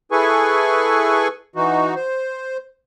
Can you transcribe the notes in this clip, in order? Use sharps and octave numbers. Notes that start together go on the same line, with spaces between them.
E4 G#4 A4 B4 G#5 C#6
E3 D#4 F#4
C5